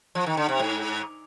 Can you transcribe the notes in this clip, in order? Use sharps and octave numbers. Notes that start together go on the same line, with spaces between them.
F3
D#3
D3
C3
G#2